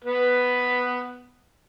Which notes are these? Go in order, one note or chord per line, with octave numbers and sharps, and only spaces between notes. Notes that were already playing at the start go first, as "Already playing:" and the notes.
B3 B4